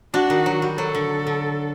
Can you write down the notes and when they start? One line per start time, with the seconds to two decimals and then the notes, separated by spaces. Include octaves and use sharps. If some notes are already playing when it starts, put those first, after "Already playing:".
0.13 D4 F#4
0.30 D#3
0.46 F#3
0.62 G3
0.78 F#3 A4
0.95 D3
1.27 D3